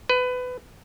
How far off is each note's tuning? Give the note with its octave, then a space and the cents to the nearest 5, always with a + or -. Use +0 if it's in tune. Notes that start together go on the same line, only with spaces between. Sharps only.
B4 +25